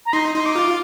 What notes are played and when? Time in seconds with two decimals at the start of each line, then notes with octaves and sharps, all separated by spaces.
0.06 A#5
0.13 D#4 C6
0.34 D#4 C6
0.46 D6
0.56 F4